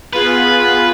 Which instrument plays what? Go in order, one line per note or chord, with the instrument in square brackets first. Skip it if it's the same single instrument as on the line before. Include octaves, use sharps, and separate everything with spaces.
[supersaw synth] B3 F4 G#4 [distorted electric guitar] B4